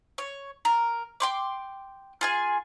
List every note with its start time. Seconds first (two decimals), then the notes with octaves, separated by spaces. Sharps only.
0.18 C#5
0.65 A#4
1.20 G5 C6 D6
2.21 F4 G#4 G#5